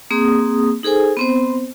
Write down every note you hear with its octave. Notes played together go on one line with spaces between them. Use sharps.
A#3 C4 G#4 D#6
D#4 G#4 A4 C5 G#5
B3 C4 C5